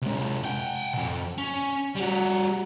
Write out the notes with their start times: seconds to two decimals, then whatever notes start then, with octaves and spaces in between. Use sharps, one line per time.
0.02 C3 G#3
0.44 F#5 G5
0.94 B1 F2
1.38 C#4
1.95 G3 F#4